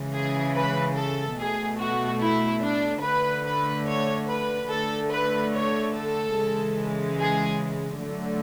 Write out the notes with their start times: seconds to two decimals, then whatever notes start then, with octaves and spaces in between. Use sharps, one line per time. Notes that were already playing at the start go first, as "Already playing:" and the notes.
Already playing: C#3 E3 G#3
0.13 G#4
0.55 B4
0.95 A4
1.37 B2 A3 G#4
1.79 F#4
2.21 E4
2.63 D4
3.03 D3 A3 B4
3.45 B4
3.88 C#5
4.28 B4
4.69 D3 A3 A4
5.11 B4
5.54 C#5
5.94 A4
6.36 C#3 E3 G#3
7.19 G#4
8.02 D3 F#3 A3